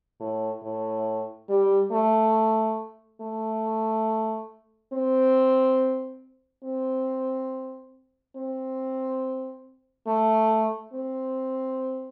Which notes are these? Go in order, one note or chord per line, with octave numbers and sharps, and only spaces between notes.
A2
A2
G3
A3
A3
C4
C4
C4
A3
C4